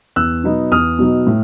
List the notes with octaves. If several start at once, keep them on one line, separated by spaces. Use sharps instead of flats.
E2 E6 F#6
B2 F#3 B3 D#4
E2 D#6 F6
B2 F#3 B3 D#4
A2